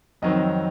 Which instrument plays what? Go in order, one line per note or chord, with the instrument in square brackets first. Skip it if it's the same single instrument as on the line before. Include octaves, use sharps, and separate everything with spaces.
[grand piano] F2 D#3 F#3 C4 D#5